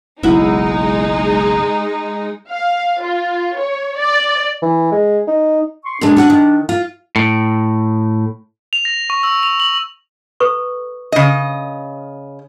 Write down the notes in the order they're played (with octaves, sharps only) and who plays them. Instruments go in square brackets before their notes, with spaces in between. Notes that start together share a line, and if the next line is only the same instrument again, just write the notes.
[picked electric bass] F#1 B1 [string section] G#3 D#4 [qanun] E4 F#4
[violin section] F5
F4
C#5
D5
[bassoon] E3
G#3
D#4
[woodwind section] C6 C#6
[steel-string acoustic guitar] A#2 C#3 G#3 [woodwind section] D4
[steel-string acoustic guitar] C#4 F#4 F#5
D#3
F4
[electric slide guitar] A2
[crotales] F7
A#6
C#6
E6
F7
F#7
[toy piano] A4 B4 C#6
[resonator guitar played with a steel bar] C#3 D#5